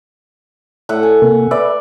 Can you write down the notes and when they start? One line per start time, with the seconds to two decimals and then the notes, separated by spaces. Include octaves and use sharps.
0.89 A2 E5 F#5
1.03 G#5
1.22 C3 A#3
1.51 B4 D5 E5